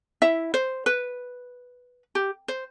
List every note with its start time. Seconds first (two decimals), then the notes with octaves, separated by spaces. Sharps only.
0.22 E4 E5
0.54 C5
0.86 B4
2.15 G4
2.48 C5